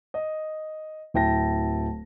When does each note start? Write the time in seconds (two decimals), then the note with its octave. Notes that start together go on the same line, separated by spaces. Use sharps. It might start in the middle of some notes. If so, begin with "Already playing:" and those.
0.14 D#5
1.14 D1 E4 G5 A5 A#6